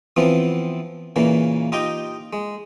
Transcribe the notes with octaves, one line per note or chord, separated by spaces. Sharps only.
E3 F3 B3 C4 F4
A#2 C#3 E3 A#3
D#4 F4 G4 D#5 G5
G#3